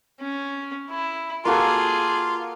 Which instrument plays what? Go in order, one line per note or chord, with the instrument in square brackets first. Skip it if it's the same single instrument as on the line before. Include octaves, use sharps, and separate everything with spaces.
[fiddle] C#4
E4
[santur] A#3 F#4 A4 [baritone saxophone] F4 [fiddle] G#4